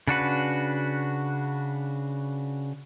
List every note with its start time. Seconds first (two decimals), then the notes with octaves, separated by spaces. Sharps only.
0.07 C#3 D4 F#4 B4